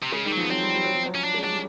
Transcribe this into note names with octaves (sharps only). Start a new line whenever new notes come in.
C3
C#3 G#3
D#3 G3
F#3
F3 B3
F#3 C4
G3
G3
F#3
F3
F#3
C#4
D4
G#3
F#3 D4
G3